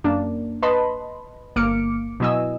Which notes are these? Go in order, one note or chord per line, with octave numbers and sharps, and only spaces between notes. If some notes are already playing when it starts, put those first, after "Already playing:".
F#2 A#3 D4
B4 D#5 A5 B5 C6
G1 A#3 D6 F6 C#7 D7
B2 F#3 E4 D#5 G#5 E6